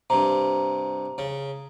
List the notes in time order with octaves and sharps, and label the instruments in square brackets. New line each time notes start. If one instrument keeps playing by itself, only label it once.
[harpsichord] G2 C3 [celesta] A#5
[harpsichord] C#3